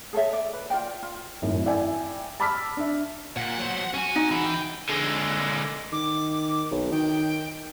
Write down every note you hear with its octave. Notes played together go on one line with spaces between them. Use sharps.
G#4 A4 C#5 E5
D5
B4
F4 D5 G5
F4
G#1 F#2 A2
E4 D5 E5 G5 G#5
A5 B5 D6 E6 F6 B6
D4 E5
A#2 F#5
F#3 C5
C#4 F#4 G#5
D#4
E3 F#4 G#4
G5
D3 G#3
D#3 D6
B1
D#3 G5